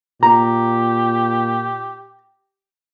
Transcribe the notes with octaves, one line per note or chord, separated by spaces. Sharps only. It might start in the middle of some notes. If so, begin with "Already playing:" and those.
A#2 G4 A#5